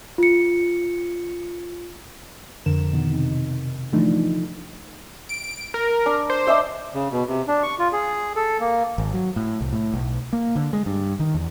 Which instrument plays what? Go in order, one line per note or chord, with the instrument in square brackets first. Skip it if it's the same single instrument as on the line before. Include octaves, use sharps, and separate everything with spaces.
[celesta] F4 C#7
[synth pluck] F2 D3 A#4 E7
B2 D#3
C3 D#4
D3 E3 F3 A3 D4 D#4
[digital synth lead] D7
A#4
[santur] D4
[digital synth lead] C5
[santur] D4 D#5 E5
[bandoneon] C#3
B2
C3
D4
C#6
F4
G#4
A4
A#3
[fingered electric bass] G#1
F#3
A2
C2
A2
B1
A#3
D3
G#3
G2
D#3
E2